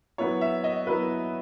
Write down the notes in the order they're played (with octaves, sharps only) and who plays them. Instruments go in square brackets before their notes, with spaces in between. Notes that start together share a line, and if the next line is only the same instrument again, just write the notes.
[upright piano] F#3 B3 E4 C#5
E5
D#5
F#3 B3 E4 B4